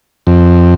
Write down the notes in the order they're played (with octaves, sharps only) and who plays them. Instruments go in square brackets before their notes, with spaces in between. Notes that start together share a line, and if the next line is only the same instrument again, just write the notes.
[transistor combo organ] F2